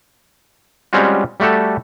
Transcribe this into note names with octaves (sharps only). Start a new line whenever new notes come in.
G3 G#3 C4 C#4 F4 F#4
G3 A3 F#4 G4 A4